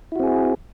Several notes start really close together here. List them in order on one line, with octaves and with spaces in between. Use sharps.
E4 F#4 C4 G#4